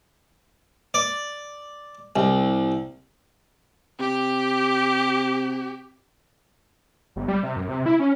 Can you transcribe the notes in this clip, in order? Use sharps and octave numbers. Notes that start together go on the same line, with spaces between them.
D5
C2
C3 G4
G1
G3
C3
F#2
C3
E4
C#4